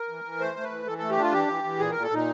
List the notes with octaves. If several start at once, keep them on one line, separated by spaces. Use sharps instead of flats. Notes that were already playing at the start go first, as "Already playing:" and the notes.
Already playing: A#4
E3
E3
A3 C5
A3
B4
E3
E3 A4
A3 A4
G4
D4 F4
E3 G4
E3
E3
A#2 G#4
A#2 A#4
A4
A#2 D#4